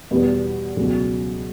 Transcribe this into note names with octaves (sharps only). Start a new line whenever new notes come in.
E2 B2 G3 B3
C#2 B2 F#3